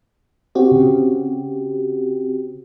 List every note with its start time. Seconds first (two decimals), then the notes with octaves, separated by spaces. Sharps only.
0.55 C4 F#4 G4
0.71 C#3